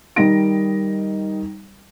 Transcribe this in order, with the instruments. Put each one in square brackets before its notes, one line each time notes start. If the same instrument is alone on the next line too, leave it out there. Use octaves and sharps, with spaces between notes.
[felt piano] D#3 G3 D#4 A#6 D7